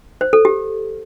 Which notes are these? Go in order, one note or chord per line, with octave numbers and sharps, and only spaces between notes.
C5
A4
G4